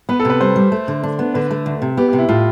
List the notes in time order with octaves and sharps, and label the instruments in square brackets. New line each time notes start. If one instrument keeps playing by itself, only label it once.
[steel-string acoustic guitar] B3 [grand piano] B4
[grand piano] A4
[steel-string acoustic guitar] C3 [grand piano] B4
[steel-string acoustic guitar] G3 [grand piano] C5
[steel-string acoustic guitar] G3
A3
D3
D4
B3
[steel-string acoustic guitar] D3 [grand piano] B4
[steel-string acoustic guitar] A3
D2
C3
[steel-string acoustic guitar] B3 [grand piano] G4
[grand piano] G4
[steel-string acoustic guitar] C3
[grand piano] E4
[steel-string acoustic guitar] A2 [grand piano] F4